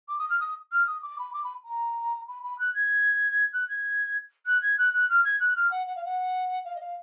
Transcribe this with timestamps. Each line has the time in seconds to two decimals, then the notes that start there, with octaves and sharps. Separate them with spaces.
0.09 D6
0.19 D#6
0.30 F6
0.40 D#6
0.72 F6
0.87 D#6
1.02 D6
1.19 B5
1.34 D6
1.44 B5
1.65 A#5
2.28 B5
2.43 B5
2.59 F#6
2.75 G#6
3.53 F#6
3.69 G#6
4.46 F#6
4.62 G#6
4.78 F#6
4.94 F#6
5.10 F6
5.25 G#6
5.40 F#6
5.56 F6
5.71 F#5
5.87 F#5
5.96 F5
6.05 F#5
6.65 F5
6.76 D#5
6.80 F5